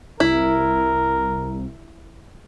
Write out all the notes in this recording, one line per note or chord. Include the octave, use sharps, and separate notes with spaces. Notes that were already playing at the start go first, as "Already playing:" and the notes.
C2 E4 A#4